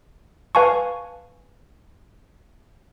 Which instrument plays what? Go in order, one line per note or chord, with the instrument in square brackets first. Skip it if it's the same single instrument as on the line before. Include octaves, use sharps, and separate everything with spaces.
[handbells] B4 F5 G#5 A5 C#6